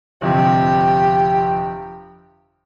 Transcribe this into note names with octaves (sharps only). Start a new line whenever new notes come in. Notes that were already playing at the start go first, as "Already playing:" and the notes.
G1 F2 C3 G4